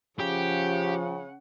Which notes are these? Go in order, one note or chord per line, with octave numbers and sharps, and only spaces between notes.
C#3 F3 C#4 G4 F#5